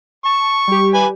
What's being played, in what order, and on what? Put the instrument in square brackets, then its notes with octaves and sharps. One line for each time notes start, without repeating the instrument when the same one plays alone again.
[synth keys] A5 [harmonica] C#6
[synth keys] G3 G4
[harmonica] B4 G#5